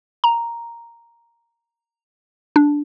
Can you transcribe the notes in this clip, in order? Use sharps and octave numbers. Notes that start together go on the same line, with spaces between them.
A#5
D4